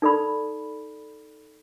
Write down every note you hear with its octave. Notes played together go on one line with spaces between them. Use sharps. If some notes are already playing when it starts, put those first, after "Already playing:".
D#4 A4 D5 B5